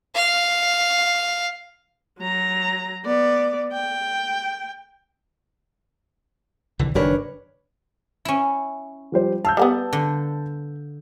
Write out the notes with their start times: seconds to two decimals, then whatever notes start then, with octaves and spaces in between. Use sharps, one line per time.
0.15 F5
2.19 F#3 A#5
3.05 B3 D5
3.73 G5
6.79 C2 D3 E3
6.95 F#1 G2 D#3 D4 A#4 B4 C#5
8.25 C#4 E4
9.12 F3 G3 C5
9.45 F5 A5 E6 G6
9.57 G3 A#3 B3
9.93 D3